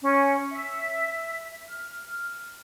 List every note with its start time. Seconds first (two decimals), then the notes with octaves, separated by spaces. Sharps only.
0.01 C#4
0.51 E5
1.68 F6